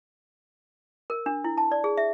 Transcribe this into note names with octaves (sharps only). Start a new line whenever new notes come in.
A#4
D4
E4
A5
D5
G#4
E5